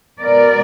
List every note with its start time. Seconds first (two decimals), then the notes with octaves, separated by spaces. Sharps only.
0.20 B2 G#3 B3 A#4 D5